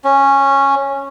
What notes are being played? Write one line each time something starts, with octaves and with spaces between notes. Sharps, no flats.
C#4